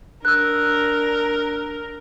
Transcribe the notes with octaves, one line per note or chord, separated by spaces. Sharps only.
D4 A#4 E6 F#6